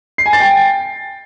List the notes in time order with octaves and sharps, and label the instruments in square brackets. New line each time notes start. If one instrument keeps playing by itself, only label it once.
[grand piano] C7
G#5
A6
G5